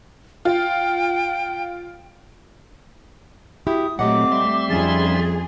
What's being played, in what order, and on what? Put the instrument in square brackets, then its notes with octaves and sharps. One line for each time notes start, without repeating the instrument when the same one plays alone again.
[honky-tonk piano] F4 [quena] G5
[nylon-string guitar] E4 F#4 G4 [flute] D#6
[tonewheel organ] A#2 F#3 [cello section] A3 C4 [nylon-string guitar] G4 D#5 F#5 [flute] D6
[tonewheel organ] G3 E5 C6
[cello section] F2 G#4 [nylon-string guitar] C#4 D#4 [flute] A6